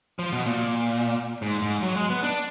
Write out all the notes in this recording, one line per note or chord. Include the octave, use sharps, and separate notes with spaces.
F3
B2
A#2
G#2
G#2
F#3
G#3
B3
D4